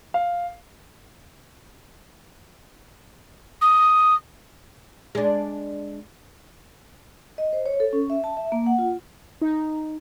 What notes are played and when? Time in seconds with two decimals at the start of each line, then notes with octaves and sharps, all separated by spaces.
0.14 F5
3.61 D#6
5.15 G#3 D4
7.38 D#5
7.53 C5
7.66 C#5
7.80 A4
7.93 C#4
8.10 E5
8.24 A5
8.37 E5
8.52 A#3
8.66 F#5
8.79 F4
9.41 D#4